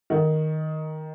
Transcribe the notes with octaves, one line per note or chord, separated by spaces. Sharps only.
D#3